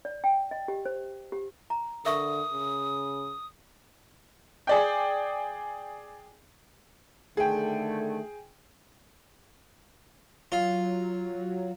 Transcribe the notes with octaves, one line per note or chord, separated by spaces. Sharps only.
D5
G5
D#5
G4
C5
G4
A#5
D3 A#4 E5 C#6 D#6
C#3
G#4 D5 G5
D3 D#3 A3 G#4 G5
F#3 F4